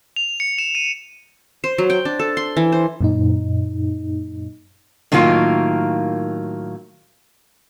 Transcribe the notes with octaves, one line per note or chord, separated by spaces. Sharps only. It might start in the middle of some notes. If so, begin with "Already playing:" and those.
F7
C#7
E7
D#7
C5
F#3
G5
D4
A4
C6
E3
C5
F#2 A#2 D#4
A2 D#3 F#3 A#3 F4